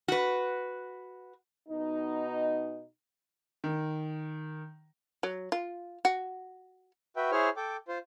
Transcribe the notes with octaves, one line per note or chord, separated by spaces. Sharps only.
F#4 B4
B2 B3 D#4
D#3
F#3
F4
F#4
F#4 B4 E5 G5
E4 G#4 C5 C#5 F6
A4 G5 D6
F4 C5